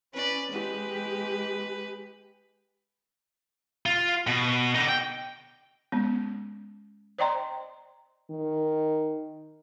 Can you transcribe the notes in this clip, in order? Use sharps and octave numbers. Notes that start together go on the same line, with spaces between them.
C#4 B4 D5
G#3 G4 B4
F4
B2
D3 D#4
G5
G#3 B3 C#4
C5 D5 D#5 G5 A#5 C6
D#3